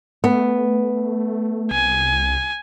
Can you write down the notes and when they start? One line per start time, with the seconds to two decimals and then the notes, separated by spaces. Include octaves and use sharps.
0.24 A3 B3
1.71 C2 G#5